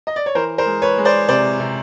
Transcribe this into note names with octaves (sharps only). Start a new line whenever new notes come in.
D#5
D5
C#5
E3 A#4 C5
A#4 C5
G#3
B4 C#5
G#3
C5 D5
C3 C5 D5
C3